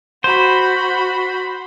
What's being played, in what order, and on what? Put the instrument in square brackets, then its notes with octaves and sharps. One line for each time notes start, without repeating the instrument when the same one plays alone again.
[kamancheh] F#4 B5 [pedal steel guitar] C5